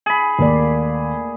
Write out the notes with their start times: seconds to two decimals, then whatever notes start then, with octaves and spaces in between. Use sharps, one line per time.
0.06 G#4 B5
0.39 D#2 A3 A#3 D5